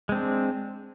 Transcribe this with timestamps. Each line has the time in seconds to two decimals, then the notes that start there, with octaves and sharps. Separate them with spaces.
0.09 G#3
0.12 C4
0.15 D4